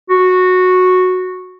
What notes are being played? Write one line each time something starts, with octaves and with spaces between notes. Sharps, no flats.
F#4